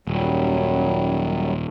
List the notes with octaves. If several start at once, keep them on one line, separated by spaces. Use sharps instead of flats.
D#1 F#2 F#3 G3